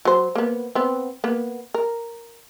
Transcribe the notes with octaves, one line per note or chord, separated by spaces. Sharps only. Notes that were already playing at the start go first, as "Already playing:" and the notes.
F#3 C5
A#3 B3
B3 C4
A#3 B3
A#4